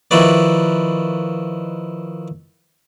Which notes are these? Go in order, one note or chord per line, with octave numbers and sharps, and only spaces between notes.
D#3 F3 E4 F#4 B4 D5